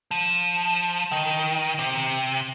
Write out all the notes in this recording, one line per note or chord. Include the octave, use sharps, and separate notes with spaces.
F3
D#3
C3